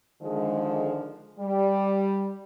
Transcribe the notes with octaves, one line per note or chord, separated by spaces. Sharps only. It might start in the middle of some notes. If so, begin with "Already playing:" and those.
D3 D#3 F3 G#3
G3